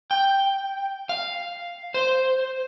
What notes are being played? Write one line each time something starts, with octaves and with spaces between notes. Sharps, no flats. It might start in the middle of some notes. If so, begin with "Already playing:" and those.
G5
F5
C5